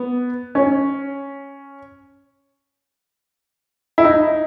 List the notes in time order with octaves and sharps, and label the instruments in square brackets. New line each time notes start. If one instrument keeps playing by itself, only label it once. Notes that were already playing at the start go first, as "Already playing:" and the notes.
Already playing: [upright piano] B3
C#4
E4
D#4